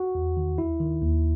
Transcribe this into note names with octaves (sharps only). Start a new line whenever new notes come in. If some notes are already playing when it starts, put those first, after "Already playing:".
Already playing: F#4
E2
D#3
D#2 E4
D#3
D#2